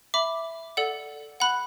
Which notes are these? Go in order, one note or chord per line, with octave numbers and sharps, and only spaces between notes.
E5 B5 D6
A4 D5 F#5
F#5 B5 F#6